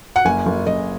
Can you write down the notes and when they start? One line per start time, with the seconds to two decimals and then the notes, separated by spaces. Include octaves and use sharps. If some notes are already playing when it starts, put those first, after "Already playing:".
0.16 F#5
0.25 F#1 G#5
0.46 F#1
0.66 F#1 D#5